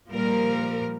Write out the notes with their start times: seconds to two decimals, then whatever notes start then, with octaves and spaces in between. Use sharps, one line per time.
0.11 A#2 F3 G3 A#4